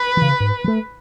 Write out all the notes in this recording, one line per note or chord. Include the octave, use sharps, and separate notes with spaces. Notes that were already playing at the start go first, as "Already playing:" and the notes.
Already playing: B4
C#3 E3
G#2
F3
A3